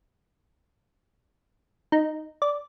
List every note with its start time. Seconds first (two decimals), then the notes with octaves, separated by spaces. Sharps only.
1.92 D#4
2.42 D5